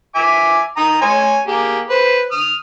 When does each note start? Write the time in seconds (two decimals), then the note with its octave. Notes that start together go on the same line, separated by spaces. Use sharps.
0.15 E5 G#5 D6
0.77 G5 A#5 D#6
1.01 C#5 G#5 C6
1.47 A#3 G4 G#4
1.90 B4 C5
2.31 D#6 F6